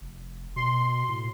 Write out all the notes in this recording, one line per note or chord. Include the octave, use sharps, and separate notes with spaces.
F1
B2 C6
A2